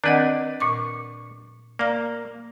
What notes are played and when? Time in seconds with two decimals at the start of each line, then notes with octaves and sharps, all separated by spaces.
0.04 D#3 C4 D4 B4 D5 D#5 F#5
0.60 A#2 C#6 D6
1.79 A#3 D5 F5 A#5